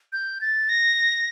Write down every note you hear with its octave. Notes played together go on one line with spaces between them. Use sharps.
G6
A6
A#6